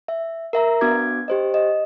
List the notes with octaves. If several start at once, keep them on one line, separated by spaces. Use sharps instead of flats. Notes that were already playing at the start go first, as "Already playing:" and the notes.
E5
A#4 E5 A#5
B3 D4 F#4 D6 G#6
G4 C5 D#5
D#5